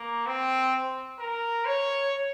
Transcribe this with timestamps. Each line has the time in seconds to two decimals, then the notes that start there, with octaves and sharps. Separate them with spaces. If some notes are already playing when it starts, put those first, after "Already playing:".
Already playing: A#3
0.26 C4
1.19 A#4
1.66 C#5